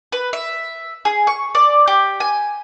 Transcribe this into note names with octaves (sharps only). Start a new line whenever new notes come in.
B4
E5
G#4
C#6
D5
G4
G#5